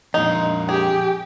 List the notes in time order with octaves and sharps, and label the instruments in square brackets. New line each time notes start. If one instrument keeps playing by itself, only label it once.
[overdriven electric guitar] F2 A#2 [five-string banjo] D#4
[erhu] G4 [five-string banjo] G#4